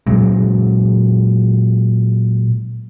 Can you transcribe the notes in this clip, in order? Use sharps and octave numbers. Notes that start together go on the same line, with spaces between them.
A#2 F#3 G#3